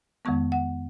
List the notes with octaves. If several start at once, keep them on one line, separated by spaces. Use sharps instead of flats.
F2 D#3 G#3 B3 C#6
F#5